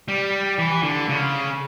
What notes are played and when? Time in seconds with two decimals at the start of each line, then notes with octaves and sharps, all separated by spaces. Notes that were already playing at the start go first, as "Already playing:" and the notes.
0.08 G3
0.58 E3
0.83 D3
1.09 C#3